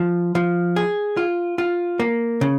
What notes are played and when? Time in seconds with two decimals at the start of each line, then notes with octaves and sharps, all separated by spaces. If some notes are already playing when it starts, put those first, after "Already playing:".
Already playing: F3
0.35 F3
0.76 G#4
1.17 F4
1.58 F4
2.00 A#3
2.41 C#3